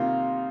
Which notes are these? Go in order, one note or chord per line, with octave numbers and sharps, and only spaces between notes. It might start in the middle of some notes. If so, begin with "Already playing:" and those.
Already playing: C3 D#3 G3 A#3 D#4 F4